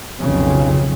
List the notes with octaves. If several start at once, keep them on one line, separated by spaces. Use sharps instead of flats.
B1 F2 C#3